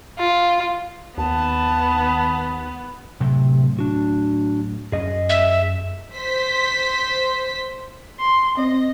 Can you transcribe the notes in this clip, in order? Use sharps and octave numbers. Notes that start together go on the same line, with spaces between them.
F4
D#2 B3 A5
A2 C3 F#3 A3
D4 F#4
F#2 C#4 G#4 D#5
E5
C5 B6
C6
C4 D#5